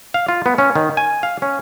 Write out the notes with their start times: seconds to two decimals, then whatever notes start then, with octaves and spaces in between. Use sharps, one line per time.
0.14 F5
0.28 F4
0.46 B3
0.58 C#4
0.76 D#3
0.97 G#5
1.23 F5
1.42 C#4